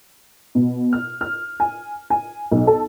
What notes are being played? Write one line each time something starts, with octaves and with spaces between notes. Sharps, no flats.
B2
F6
F6
G#5
G#5
B1
A4